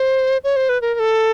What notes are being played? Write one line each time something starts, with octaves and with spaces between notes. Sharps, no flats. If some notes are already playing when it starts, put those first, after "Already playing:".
Already playing: C5
C#5
C5
B4
A#4
A#4
A4